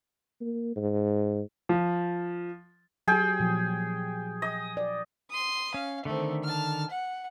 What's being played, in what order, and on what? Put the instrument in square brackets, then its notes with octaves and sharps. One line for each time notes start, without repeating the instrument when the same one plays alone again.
[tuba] A#3
G#2
[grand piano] F3
[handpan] F#3 G4 [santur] G#4 G5
[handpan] A#2 F3
[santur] D#5
[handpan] D5
[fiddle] C6 D#6
[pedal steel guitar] C#4 [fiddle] F5
[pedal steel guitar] D3 D#3 [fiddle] A3 C4
[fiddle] A5 F6
F#5